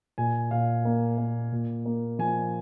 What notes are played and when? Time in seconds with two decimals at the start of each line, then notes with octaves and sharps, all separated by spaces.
0.18 A#2 G#5
0.51 A#2 F5
0.85 A#3
1.18 A#3
1.52 A#2
1.86 A#3
2.19 F3 G#5